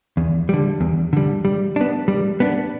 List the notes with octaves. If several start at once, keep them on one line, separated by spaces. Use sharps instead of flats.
E2
D3 G3
E2
D3 G3
G3
B3 D4
G3
B3 D4